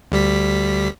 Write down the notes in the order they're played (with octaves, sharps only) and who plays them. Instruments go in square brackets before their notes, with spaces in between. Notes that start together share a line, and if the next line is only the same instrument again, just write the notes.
[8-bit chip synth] D2 G3 B6